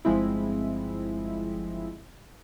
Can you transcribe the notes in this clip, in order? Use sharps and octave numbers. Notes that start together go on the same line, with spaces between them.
G1 F3 G#3 C4 E4